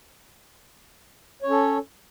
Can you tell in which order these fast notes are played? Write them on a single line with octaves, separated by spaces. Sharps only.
C#5 C#4 A4